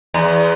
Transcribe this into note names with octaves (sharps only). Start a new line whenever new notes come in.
E2